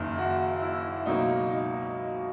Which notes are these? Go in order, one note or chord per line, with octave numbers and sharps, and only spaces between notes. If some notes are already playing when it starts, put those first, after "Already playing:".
Already playing: F#1 F#2 D#3 A#3
F#4
E4
C#2 B2 F#3 A#3 D#4
D#4